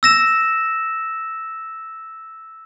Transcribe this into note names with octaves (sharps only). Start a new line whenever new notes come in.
E6 A#6 E7